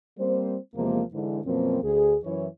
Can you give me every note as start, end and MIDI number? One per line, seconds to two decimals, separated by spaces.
0.19 0.57 55
0.19 0.57 58
0.19 0.57 60
0.19 0.57 72
0.76 1.02 40
0.76 1.02 48
0.76 1.02 53
0.76 1.02 56
0.76 1.02 58
1.13 1.40 44
1.13 1.40 50
1.13 1.40 52
1.45 1.79 42
1.45 1.79 47
1.45 1.79 53
1.45 1.79 58
1.45 1.79 60
1.83 2.16 38
1.83 2.16 68
2.24 2.47 42
2.24 2.47 52
2.24 2.47 64
2.24 2.47 73